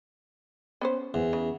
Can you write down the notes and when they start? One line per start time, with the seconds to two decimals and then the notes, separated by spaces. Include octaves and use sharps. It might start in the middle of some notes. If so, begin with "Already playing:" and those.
0.81 B3 C#4 C5
1.14 E2
1.33 C#3